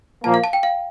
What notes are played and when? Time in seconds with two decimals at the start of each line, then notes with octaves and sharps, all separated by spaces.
0.24 A#2 F3 A#3 A5
0.34 F5
0.44 A5
0.53 G5
0.63 F5